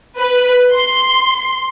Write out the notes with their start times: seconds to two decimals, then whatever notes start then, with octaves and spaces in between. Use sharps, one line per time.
0.19 B4
0.73 C6